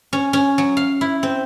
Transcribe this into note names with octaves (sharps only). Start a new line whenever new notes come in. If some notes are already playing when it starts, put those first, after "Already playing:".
C#4
C#4
F#3
F5
E4
C4